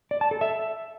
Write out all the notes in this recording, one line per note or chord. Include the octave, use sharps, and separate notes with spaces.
D5
A5
A4
E5